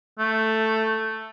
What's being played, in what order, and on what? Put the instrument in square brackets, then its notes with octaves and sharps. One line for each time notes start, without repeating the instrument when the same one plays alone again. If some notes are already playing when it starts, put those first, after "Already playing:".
[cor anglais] A3